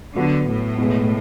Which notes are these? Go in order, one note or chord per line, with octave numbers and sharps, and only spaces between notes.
D3 F#3 B3 F#4
A2
B2 G#3 B3